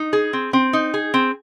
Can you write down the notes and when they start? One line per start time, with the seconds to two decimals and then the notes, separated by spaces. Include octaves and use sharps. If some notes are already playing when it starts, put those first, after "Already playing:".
Already playing: D#4
0.13 G#4
0.33 C4
0.53 C4
0.73 D#4
0.94 G#4
1.14 C4